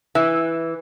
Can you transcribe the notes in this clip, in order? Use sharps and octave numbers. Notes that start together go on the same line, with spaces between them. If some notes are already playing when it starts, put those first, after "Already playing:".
E3